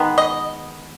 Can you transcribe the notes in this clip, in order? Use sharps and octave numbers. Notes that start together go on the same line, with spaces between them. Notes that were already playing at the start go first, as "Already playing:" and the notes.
Already playing: D#3 G#3 B3
D#5